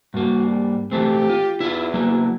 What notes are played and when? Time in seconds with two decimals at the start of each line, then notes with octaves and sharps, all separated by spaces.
0.14 G2 A#3 F#4
0.46 G3
0.91 E3 A3 C4 G4
1.29 F4
1.60 E2 E4 F4
1.94 F#3 A#3 E4